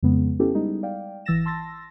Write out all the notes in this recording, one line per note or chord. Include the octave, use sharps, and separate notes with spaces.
F2 C#3 G#3 B3
B3 C#4 E4 G4 A4
G3 G#3 B3 D#4
D5 F5 G5
G#1 E3 E6 A6 A#6 E7
A5 C6 E6 A6 A#6